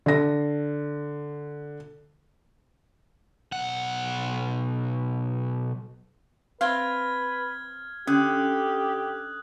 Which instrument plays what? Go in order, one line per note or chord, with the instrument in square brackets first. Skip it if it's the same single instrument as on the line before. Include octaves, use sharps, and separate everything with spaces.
[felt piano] D3 A#6
[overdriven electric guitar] B1 F#5
[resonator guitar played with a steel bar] C4 F5 [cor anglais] B4 [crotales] F6 G#6 G7
[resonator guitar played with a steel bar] D3 [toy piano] C#4 [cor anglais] G4 [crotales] D#6 F#6